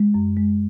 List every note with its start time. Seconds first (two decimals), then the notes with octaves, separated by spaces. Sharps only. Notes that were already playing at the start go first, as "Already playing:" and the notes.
Already playing: G#3
0.14 F#2
0.37 G#3